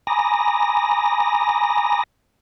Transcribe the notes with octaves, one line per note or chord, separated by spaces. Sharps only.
G#5 A#5 B5 D6 D#6 A#6